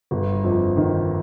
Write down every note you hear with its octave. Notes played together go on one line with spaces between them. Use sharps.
G1
F2
D#3